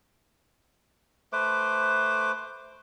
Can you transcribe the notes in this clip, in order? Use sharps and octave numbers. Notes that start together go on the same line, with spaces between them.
A3 B4 C5 D6